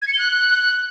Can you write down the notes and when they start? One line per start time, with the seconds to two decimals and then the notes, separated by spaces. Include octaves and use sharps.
0.02 G#6
0.08 C#7
0.13 G7
0.19 F#6